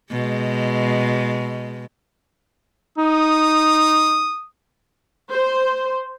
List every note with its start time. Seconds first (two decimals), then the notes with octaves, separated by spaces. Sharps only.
0.11 B2 G#3
2.98 D#4 D#6
5.29 C5